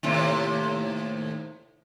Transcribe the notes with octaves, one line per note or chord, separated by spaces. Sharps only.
D#2 A2 C3